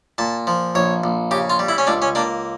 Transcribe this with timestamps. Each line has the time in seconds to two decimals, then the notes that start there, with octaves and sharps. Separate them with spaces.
0.18 A#2 A5
0.47 F3
0.75 A#1 C#5
1.04 A#1
1.31 C#3 G4
1.50 F4
1.59 G3
1.69 E4
1.78 C#4
1.87 C#2 D4
2.02 C#4
2.15 A#3 D4